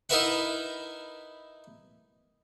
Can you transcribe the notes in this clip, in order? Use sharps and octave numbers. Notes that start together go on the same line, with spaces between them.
D#4 E4 A#4 B4 E5 F#5